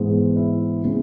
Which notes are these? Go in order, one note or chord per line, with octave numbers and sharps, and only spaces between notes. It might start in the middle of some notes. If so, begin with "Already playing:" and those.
Already playing: G#2 E3 G#3 B3
E4
C#3 G#3 B3